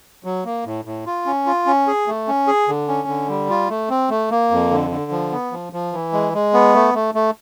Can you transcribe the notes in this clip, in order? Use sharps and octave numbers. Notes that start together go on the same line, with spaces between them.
F#3
A#3
A2
A2
F4
C#4
F4
C#4
G#4
A3
C#4
G#4
D3
C#4
D3
G3
F4
A3
C4
A3
A#3
F2
D3
D3
F3
B3
F3
F3
E3
G#3
G#3
B3
A3
A3
A3